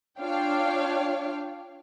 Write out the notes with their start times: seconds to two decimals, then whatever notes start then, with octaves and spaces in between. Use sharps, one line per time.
0.19 D4 F4 C#5 F5 G5